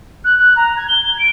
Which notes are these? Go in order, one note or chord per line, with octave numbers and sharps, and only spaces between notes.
F#6
F#6
A#5
G#6
G7
G#6
D7